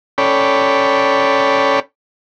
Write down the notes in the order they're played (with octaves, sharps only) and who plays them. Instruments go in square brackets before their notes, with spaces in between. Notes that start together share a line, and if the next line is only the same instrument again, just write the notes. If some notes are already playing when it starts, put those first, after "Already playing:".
[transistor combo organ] C#4 A4 C#5 D5 G5 B5